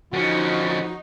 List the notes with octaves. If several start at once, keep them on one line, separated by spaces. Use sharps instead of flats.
D3 F3 C#4 D#4 F#4